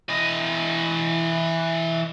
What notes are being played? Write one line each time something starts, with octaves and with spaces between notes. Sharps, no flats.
E3 D#5